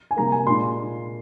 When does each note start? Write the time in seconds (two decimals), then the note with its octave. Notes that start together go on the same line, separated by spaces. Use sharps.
0.11 G#5
0.17 C3 G3 A#3 A#5
0.32 G#5
0.47 A#2 G#3 D4 C6